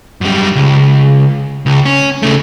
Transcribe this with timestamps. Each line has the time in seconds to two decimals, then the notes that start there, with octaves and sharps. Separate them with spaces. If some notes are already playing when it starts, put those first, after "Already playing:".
0.21 F#2 G3
0.55 C#2
1.66 C#2
1.85 C#4
2.22 C#3 A3